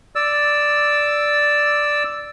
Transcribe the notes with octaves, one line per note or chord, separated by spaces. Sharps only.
D5 E6